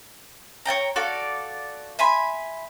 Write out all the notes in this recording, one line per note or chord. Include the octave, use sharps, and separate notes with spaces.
C#5 D5 G5 A#5
F#4 A4 D5 F5
E5 G#5 B5 C6